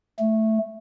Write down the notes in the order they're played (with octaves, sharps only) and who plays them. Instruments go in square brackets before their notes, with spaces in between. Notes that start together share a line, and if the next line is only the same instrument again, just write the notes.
[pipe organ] A3